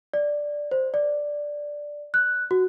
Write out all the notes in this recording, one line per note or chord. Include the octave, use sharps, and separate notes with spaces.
D5
C5
D5
F#6
F#4